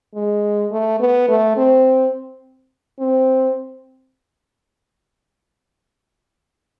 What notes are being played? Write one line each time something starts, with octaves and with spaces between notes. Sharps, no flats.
G#3
A3
B3
A3
C4
C4